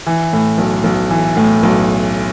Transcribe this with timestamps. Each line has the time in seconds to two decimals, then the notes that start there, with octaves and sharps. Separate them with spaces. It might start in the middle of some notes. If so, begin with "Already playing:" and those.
0.07 E3
0.33 A2
0.58 B1
0.84 B1
1.10 E3
1.37 A2
1.63 B1